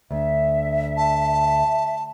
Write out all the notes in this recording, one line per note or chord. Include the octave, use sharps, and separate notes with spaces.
D2 E5
A5